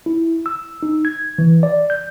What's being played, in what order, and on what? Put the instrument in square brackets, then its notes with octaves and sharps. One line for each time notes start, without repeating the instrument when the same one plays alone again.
[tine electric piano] E4
E6
D#4
G#6
E3
D5
G6